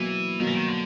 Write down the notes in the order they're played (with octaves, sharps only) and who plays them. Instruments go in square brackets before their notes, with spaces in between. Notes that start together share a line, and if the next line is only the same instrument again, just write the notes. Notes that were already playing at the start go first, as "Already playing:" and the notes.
Already playing: [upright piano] B2 F#3 A#3 [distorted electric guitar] E3
[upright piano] B2 F#3 A#3 [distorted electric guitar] D#3
[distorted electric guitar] E3
D#3
D3